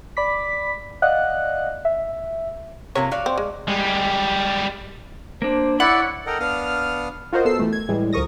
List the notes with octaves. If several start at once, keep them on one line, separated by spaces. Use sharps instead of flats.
D5 B5 D6 B6
D5 D#5 F5 F#5 F#6
E5
C3 F3 A#3 C#5
F#4 D5 F5
C4
G#3
G3 G#3
A#3 D4 C5
E4 C#5 D5 F#5 B5 E6
A4 A#4 D#5 F#5 G5
B3 D4 F5 D#6 F6
F4 F#4 A#4 C5 D#5
B3 A4 E6 C7
E3 A3
G#6
A2 E3 G3 G#3
D2 F3 A#4 C#6 D#6 A#6